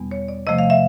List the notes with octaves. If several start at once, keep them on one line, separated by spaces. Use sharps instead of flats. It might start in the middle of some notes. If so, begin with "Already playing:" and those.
Already playing: E2 B2 G3 B3
C#5
D5
C3 F3 A3 D#5
F5
E5